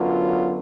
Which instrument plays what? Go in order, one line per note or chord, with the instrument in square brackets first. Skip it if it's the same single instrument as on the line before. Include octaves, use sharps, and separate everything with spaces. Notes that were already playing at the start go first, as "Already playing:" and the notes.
Already playing: [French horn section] F#2 D3 F#3 B3 F4